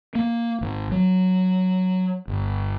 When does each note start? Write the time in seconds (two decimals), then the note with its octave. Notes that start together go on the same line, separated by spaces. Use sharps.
0.15 A#3
0.61 G#1
0.91 F#3
2.28 G1